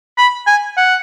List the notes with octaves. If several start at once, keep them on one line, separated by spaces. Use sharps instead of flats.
B5
G#5
F#5